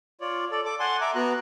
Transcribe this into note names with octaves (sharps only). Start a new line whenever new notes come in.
F4 C#5 D5
A4 D5
A4 D6
F#5 G#5 A5 C6
E5 A#5 D6
B3 F#4 A#5 F#6